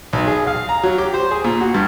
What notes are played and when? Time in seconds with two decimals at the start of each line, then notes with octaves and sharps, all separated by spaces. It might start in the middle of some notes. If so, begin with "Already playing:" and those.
0.13 B1
0.27 G#4
0.47 F5
0.69 A#5
0.83 F#3
0.98 G4
1.14 C5
1.31 G#4
1.44 A#2
1.61 F#4
1.74 G2